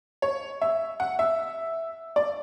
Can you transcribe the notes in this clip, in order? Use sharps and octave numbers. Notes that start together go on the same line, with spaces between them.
C#5
E5
F#5
E5
D5